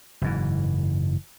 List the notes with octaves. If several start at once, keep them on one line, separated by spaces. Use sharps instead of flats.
F#1 G#2 E3